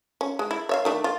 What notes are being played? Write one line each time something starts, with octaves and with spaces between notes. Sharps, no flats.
C#4
G#3
E4
C#5 E5 F5
D#3 A3 D4
F4